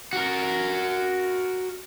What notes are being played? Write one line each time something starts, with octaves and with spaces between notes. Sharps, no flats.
F#4 A#4